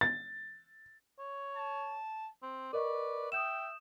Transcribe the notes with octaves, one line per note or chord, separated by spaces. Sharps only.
A6
C#5
A5
C4
A#4 B4 D5 D#5 C#6
E5 G5 D#6 G6 E7